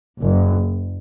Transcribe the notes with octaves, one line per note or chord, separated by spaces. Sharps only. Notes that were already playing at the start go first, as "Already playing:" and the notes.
F#1